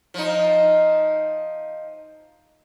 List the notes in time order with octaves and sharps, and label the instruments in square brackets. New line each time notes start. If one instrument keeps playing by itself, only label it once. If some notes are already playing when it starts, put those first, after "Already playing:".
[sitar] F3 D#4